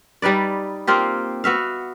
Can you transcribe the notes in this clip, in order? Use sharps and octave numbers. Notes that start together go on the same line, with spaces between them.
G3 D#4 B4 D5
A#3 C4 F4 G4
B3 F#4 E5 F5